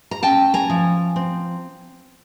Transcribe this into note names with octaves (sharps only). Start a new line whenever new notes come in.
A#5
C#4 G5 A5
G#5 A#5
F3
C4